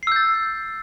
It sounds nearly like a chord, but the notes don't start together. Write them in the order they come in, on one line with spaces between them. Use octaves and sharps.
C7 E6 G6 A6